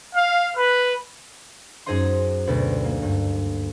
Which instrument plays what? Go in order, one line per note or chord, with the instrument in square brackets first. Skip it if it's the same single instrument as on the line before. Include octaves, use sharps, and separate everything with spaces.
[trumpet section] F5
B4
[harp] F#2 D#4 G#4 C5 D#5 C6
D2 B2 B3 D5
A#3
G2